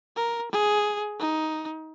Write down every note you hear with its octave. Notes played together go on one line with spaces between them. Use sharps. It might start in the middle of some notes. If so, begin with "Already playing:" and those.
A#4
G#4
D#4